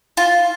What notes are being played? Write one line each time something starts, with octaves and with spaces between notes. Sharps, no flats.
F4